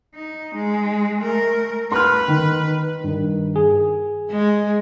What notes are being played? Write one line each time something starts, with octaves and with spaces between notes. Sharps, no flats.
D#4
G#3
A3 A#4
B4 C6 F6
D#3
G2 D#3
G#4
G#3